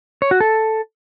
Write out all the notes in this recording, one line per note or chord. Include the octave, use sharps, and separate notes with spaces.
C#5
F#4
A4